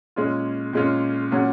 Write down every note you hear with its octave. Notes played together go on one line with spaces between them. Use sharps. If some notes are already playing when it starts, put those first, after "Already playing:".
A#2 G#3 C#4 F4
A#2 G#3 C#4 F4
A#2 F#3 C#4